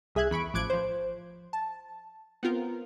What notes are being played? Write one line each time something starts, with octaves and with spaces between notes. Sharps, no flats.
C2 G#4 E5 F#6 G#6
E2 B5 C#6 D7
A1 F3 D6 F#6 G#6 D7
F3 C5
A5
B3 C4 F4 A#4